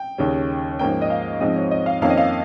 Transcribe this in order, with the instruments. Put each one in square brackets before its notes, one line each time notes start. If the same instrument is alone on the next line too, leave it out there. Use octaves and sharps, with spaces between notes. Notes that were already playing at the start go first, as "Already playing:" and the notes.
Already playing: [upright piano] G5
D#2 C#3 G3 C#4
G#2 F3 A#3 C#4 G5
D#5
F5
G#2 F3 G#3 C4 D#5
C#5
D#5
F5
F2 D#3 A#3 C#4 F5
D#5
F5